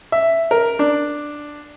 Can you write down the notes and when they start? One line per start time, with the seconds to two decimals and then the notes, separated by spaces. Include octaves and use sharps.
0.12 E5
0.51 A#4
0.79 D4